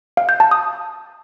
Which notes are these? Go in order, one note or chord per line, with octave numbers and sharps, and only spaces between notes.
F5
G6
A5
D#6